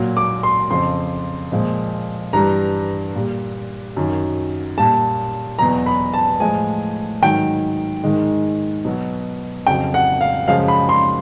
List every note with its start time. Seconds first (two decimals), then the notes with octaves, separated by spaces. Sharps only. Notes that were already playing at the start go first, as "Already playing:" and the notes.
Already playing: A#2 F#3
0.17 D6
0.43 C6
0.70 F2 C#3 F3 C6
1.52 A#2 F3 G#3
2.33 G2 E3 G3 A#5
3.15 A#2 G3
3.97 F#2 D#3 F#3
4.77 A#2 G3 A5
5.59 E2 B2 F#3 A#5
5.86 B5
6.14 A5
6.40 A2 F3 G#3 G#5
7.22 G#2 D#3 F#3 G5
8.04 G#2 D#3 G#3
8.85 B2 F#3
9.66 F2 C#3 F#3 G5
9.94 F#5
10.21 F5
10.48 F#2 C#3 F3 G#3 F5
10.68 B5
10.89 C6